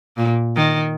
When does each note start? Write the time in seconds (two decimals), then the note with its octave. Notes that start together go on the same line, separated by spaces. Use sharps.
0.17 A#2
0.56 D#3